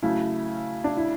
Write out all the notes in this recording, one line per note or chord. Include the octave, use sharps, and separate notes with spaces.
C#3 F#3 A3 C#4 E4
D4
E4